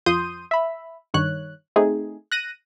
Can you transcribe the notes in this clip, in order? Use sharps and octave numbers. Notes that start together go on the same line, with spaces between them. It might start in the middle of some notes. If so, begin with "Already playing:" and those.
F2 F3 C6 D#6 G6 D#7
E5 B5
G2 D#3 C#5 F#6
A3 C4 D#4 G#4
F#6 A#6 D#7